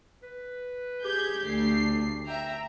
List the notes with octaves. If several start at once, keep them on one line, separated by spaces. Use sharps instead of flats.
B4
G4 G#4 G6 G#6
D2 C7
E5 G5 A#5